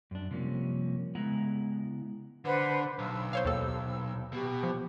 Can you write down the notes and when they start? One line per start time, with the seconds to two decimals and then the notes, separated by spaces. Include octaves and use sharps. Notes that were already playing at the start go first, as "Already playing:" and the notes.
0.11 F#2 D4
0.31 C3 F3 G3 A#3 C#4
1.15 C#3 G#3 B3 E4 F#5 A#5
2.45 D3 B4 C5 F#5
2.99 B1 E6
3.33 C5 C#5 F5
3.45 D#2 A4
4.33 B2 G4
4.63 F3